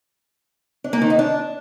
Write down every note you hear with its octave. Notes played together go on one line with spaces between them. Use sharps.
D4
A#3
D#3
D#4
D4